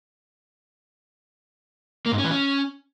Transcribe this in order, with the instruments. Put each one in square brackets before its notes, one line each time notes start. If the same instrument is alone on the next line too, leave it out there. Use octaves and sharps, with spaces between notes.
[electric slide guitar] A#3
G#2
C#4
E3
C#4